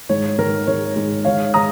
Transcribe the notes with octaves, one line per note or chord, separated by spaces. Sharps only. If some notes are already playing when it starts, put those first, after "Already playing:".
G#2 D#3 G#3 C#5
G#2 D#3 G#3 A#4
G#2 D#3 G#3 C#5
G#2 D#3 G#3
G#2 D#3 G#3 C#5 F5
D#3 G#3 A#5 D#6